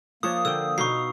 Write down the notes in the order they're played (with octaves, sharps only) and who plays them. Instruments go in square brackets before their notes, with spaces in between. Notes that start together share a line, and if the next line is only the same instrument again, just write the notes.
[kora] F3 D4 C#5 [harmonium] A#3 [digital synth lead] D#6
[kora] D3 G5 [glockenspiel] E6
[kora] B2 D#4 F5 [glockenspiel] C#6 C7